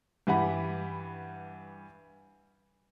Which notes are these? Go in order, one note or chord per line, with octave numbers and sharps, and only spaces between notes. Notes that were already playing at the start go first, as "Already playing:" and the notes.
G2 E3 G4 F#5 B5